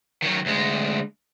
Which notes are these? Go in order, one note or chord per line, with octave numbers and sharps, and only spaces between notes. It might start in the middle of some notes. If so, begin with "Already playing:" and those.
D#3 F#3
D2 G#3